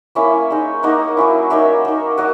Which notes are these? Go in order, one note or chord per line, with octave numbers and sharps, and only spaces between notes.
A#3 C#4 E4 C#5 E5
G#3 D#4
A#3 D#4 D#5 F#5
F#3 C#4 E4
A#3 D#4 C#5 E5
A#3 D#4
F#3 D#5 F#5